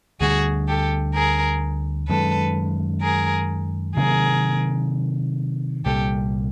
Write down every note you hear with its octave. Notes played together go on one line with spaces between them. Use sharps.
D2 D3 G3 F#4 G#4
G4 A4
G#4 A#4
F#2 D#3 G#3 A4 B4
G#4 A#4
C3 D#3 F#3 A#3 G#4 A#4
C2 A#2 G3 G4 A4